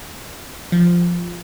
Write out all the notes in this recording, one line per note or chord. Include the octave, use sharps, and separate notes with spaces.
F3